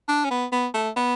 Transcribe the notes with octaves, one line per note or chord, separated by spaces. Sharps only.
D4
C#4
B3
B3
A3
B3